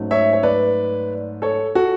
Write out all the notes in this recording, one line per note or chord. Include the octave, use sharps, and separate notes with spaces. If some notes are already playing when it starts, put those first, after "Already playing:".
Already playing: G#2 F#3 A3 C#4
C#5 E5
C#5
B4 D5
A4 C#5
F#4 A4